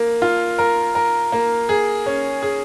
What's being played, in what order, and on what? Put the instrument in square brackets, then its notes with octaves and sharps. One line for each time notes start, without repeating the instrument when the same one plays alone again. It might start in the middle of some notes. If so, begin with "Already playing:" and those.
Already playing: [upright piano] A#3
F4
A#4
A#4
A#3
G#4
C#4
G#4